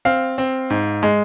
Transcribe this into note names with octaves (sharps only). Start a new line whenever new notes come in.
C4 F5
C4
G#2
G#3